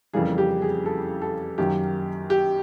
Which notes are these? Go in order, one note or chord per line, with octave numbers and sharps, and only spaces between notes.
F2 C#3 E3 G3 A#3 G#4
G4
G#4
A4
A4
F#2 D#3 F#3 A#3 G4
G4